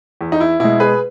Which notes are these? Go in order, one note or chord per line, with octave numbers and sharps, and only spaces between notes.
E2
D#4
E4
B2 G#3 E4
G#4 B4